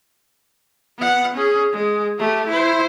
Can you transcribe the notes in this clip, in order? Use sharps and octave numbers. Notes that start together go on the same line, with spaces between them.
B3 F#5
C#4 G#4
G#3
A3 G4
E4 C5